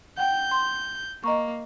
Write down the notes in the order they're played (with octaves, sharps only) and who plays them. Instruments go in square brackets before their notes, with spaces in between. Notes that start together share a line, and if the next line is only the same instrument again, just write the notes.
[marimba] F#5 G5 [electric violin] G6
[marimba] C6
[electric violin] A#3 [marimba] D#5 A#5 C#6